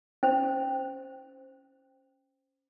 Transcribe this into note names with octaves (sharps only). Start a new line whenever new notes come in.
C#4 C5